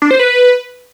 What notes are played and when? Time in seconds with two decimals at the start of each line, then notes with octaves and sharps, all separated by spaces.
0.02 D4
0.11 C5
0.19 B4